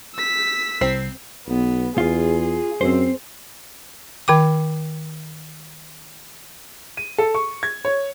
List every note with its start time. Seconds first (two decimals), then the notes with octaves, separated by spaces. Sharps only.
0.15 E6 B6
0.81 C2 C4 C7
1.48 B1 B3
1.98 E2 F4 G#4
2.81 F#2 C4 C5
4.28 D#3 G5 D6
6.97 D#7
7.18 A4
7.35 C#6
7.63 G#6
7.85 C#5